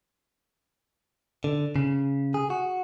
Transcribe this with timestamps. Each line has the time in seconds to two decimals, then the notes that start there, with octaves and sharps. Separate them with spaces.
1.44 D3
1.76 C#3
2.34 G#4
2.50 F#4